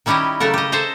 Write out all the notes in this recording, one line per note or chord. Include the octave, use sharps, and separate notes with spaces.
D#3 G3 C#4 E4 G4 D#5
C#3 F#3 A3 A4 A#4
G4 D#5
A4 C5 G#5 A#5